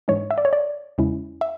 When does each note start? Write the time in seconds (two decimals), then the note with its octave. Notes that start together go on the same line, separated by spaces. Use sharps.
0.08 G#2 E3 G#3 D4 C#5
0.31 E5
0.38 D5
0.45 C#5
0.53 D5
0.98 E2 C#3 G#3 C#4 E4
1.41 E5